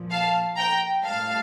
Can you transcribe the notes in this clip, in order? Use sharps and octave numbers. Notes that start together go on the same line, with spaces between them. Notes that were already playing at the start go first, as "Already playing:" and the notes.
Already playing: A#2 F3
F5 A5
G5 A#5
A2 G3 F5 A5